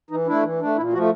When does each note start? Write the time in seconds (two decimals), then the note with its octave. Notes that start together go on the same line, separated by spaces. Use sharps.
0.10 E3 D#4
0.27 A3 D4 E4
0.43 E3
0.60 A3 D4
0.76 A#2 E4
0.93 F3 A3 F#4